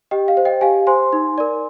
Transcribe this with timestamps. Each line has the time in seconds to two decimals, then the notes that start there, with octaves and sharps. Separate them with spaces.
0.11 G4 D#5 G5
0.28 F5
0.37 C5
0.45 D#5 G5
0.61 G4 F5 G#5
0.87 C5 G#5 C6
1.13 D#4
1.38 A#4 D5